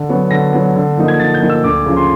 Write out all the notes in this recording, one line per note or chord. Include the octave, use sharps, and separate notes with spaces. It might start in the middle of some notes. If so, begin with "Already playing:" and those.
Already playing: D3
F#3 B3
D3 A#6
F#3 B3
D3
F3 A#3 D#4
G#6
D3 A6
G6
F3 A#3 D#4
E6
D2 D6
C#3 F3
C6